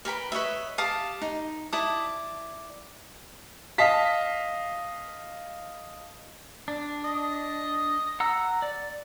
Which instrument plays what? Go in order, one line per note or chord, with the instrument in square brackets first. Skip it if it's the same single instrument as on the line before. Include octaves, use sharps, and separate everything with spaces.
[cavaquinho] A#4 B4 G5 B5
B4 C#5 D#5 E5
G4 F5 A5 D#6
D#4
E4 D5 A5 D#6
[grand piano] D#5 F5 A5 B6
[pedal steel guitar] D4
[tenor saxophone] D#5
[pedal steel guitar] F#5 A#5 E6
D5